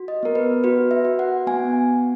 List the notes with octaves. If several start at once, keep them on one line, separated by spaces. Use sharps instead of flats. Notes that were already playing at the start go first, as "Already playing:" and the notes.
Already playing: F#4
D#5
B3 A#4
B4
F#4 B4
E5
F#4
F#5
B3 G#5